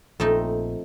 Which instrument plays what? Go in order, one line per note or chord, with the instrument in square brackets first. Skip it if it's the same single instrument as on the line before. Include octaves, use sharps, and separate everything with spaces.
[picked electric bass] A#1 [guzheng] F2 A3 D#4